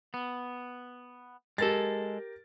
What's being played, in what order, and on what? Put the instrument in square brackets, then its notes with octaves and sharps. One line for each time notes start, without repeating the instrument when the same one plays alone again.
[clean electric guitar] B3
[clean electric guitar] G#3 A4 [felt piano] G4 A#4 A6